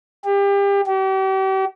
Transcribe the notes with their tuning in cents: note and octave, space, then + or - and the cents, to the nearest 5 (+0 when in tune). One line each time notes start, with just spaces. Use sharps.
G4 +30
G4 -40